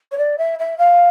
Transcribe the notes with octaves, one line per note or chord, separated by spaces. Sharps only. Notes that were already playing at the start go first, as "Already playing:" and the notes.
C#5
D5
E5
E5
F5